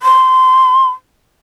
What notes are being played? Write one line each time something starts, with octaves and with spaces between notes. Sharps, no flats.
C6